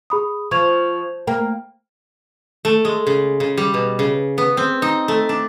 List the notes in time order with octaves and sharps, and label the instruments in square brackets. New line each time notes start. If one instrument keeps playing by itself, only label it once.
[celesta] G#4 B5 D#6
[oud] F3 [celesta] C#6 G#6 F7
[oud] A#3 [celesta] G5
[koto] A3
G#3
C#3
C#3
G3
B2
C#3
B3
C4
D#4
A3
D4